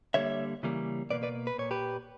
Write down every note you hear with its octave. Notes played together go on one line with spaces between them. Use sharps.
D3 G3 A#3 C#5 E5
C#3 E3 G3 A#3
B2 A#3 B4 D5
B4 D5
B4
A#2 A#3 C#5
G4 B4